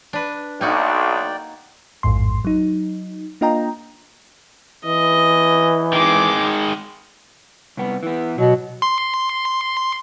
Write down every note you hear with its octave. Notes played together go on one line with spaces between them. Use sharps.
D4 B4
B1 A#3 D#4 F#4 D5 G5
A1 F2 G#2 C6
F#3 D#4
A#3 D4 F4 D#5 G5 A#5
E3 D#5
D#3 G#3 D6
C2 B3
E3 B3
B2 F#3
C6